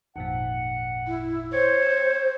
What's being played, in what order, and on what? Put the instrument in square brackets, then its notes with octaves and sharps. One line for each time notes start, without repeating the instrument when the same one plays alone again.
[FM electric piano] G#1 F2 A#2 [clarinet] F#5
[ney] E4
[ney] C5 [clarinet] C#5